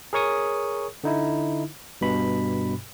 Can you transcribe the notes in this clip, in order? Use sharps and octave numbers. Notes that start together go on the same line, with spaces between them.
G#4 A#4 C#5 C#6 D#6
D3 D#4 E4
G2 B2 B5